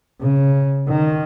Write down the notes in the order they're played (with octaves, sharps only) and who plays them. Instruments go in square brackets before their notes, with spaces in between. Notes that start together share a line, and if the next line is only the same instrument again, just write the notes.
[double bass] C#3
D#3